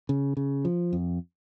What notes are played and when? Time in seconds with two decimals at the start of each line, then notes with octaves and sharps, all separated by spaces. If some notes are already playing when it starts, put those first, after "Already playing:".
0.09 C#3
0.37 C#3
0.65 F3
0.93 F2